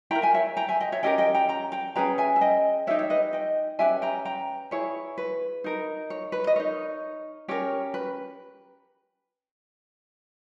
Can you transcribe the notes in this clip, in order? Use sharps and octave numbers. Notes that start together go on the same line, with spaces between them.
E4 A#4 G5 A#5
E5 G#5
C#5 E5
G5 A#5
E5 G#5
D#5 G5
C#5 E5
C#4 G4 A#4 D#5 G5
D#5 G5
G5 A#5
G5 A#5
G5 A#5
C#4 G#4 B4 G5 A#5
E5 G#5
E5
D#5 G5
D#4 G4 A#4 C#5 E5
C#5 E5
B4 D#5
D#5 G5
C#4 G4 B4 E5 G#5
G5 A#5
G5 A#5
E4 G#4 B4 C#5
B4
D#4 A#4
C#5
B4
D#5
D#4 A#4 C#5
C#4 G4 A#4 C#5
B4